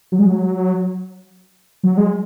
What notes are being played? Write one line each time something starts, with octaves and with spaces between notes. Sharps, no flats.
F#3
G#3
F#3
F#3
G#3